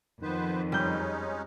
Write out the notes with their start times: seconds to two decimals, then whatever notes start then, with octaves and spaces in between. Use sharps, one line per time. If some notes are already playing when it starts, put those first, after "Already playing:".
0.22 F2 D#3 B3 B4 C5
0.72 G3 G#3 C#4 D#4 G6